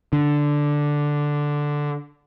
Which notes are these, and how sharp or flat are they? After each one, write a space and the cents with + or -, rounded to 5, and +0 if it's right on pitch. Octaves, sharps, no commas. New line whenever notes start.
D3 +0